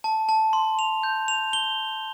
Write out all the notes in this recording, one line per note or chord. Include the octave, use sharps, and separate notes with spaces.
A5
A5
C6
F7
G6
F7
G7